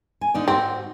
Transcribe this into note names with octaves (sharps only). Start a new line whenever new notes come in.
G#5
D3 D#4 D5
G#2 C4 F#4